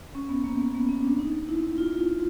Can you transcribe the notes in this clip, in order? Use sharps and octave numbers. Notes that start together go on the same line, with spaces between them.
C#4
B3
A#3
B3
B3
C#4
D4
D#4
E4
E4
F4
F4
E4